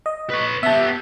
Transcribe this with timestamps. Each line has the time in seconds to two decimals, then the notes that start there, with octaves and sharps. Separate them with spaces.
0.06 D#5
0.30 B4 C#5
0.63 B3 G4 E5 A5